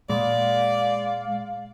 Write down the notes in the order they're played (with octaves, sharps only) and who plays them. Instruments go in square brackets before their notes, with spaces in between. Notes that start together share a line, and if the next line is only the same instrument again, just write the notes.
[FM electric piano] A#2 [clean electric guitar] G#3 [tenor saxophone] D5 [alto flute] F5